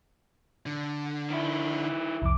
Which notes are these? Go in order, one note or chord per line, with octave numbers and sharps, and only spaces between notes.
D3
D#3 E4
C2 F2 D6